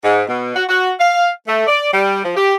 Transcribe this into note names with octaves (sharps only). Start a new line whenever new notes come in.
G#2
B2
F#4
F#4
F5
A3
D5
G3
F3
G4